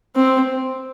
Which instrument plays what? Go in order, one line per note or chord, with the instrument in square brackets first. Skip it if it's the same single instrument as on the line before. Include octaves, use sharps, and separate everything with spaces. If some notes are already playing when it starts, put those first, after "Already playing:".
[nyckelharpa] C4